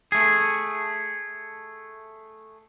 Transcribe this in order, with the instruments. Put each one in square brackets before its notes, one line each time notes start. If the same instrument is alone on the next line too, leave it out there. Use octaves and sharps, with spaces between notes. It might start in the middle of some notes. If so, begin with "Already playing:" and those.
[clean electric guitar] A3 G#4